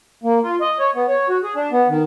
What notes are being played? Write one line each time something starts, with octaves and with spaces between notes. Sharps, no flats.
A#3
F4
D#5
C#5
B3
C#5
F#4
G#4
D4
B3
D#3